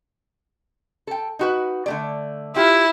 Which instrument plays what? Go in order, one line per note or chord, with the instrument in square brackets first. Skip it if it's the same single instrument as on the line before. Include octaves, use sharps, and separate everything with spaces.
[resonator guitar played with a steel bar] A4 G5
D#4 F#4 B4
D3 A3 D5
[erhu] E4 [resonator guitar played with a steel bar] F4 G4